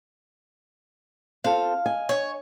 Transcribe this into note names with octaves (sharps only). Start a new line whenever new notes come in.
C4 F4 A4 F5
D#5 G#5
C#5